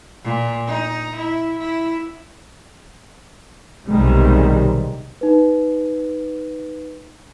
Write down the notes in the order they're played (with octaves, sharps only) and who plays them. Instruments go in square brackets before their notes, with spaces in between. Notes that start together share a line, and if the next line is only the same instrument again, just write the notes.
[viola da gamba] A#2
D#4
E4
E4
[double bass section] B1 C3 D#3 G3 G#3
[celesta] D#4 B4